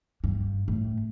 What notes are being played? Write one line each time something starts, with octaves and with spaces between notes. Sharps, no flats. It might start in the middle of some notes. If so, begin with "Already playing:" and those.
G2
A2